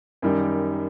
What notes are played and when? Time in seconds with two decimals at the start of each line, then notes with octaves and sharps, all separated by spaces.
0.22 F#2 D#3 G3